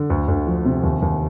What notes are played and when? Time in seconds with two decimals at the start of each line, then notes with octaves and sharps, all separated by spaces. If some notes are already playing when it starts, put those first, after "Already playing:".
Already playing: D3
0.10 D2
0.28 D2
0.47 F3
0.65 C3
0.83 D#2
1.02 D#2